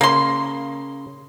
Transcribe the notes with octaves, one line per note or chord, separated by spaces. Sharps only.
C#3 A#3 C6